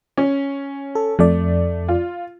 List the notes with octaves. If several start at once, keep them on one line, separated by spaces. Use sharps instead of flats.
C#4
A4
F2 A3 D5
F4